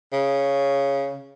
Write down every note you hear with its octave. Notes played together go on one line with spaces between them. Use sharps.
C#3